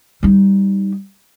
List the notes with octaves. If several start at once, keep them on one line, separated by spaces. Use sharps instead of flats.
G3 D#4